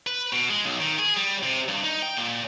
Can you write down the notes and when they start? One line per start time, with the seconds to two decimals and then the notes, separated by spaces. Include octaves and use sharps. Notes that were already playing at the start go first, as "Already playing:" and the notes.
0.07 B4
0.33 B2
0.50 G#3
0.64 B1
0.80 D#3
0.99 G#4
1.16 G3
1.44 C3
1.68 G2
1.84 D#4
2.02 G5
2.17 A#2